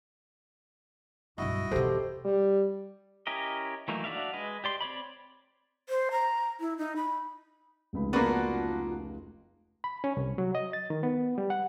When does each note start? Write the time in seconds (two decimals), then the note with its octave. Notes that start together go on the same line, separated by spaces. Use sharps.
1.38 B1 G2 E4 F#4 D#5
1.71 E2 B2 G4 A4 C5
2.25 G3
3.27 C#4 E4 G4 A#4 D#5
3.88 E3 F#3 A3 A#3 D#4
4.04 D4 F#4 D5 E5 F5
4.33 G#3 B4 D#5
4.64 G4 D5 C6
4.81 C4 C#5 D5 B5
5.89 C5
6.11 A#5
6.60 E4
6.78 D#4
6.96 B5
7.93 F1 C#2 B5
8.13 A#3 B3 D4 F4 F#4
9.84 B5
10.04 C#4
10.17 C2
10.38 F#3
10.55 D#5
10.73 A6
10.90 D#3
11.03 B3
11.38 G3
11.50 F#5